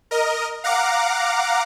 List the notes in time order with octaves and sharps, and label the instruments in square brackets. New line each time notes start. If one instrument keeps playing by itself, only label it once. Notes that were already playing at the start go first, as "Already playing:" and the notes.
[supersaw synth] A#4 D#5
F5 F#5 A#5 D6